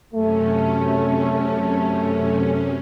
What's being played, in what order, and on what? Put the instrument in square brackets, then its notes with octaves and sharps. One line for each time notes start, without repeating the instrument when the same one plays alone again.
[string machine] F#2 C3 C#4 [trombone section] A3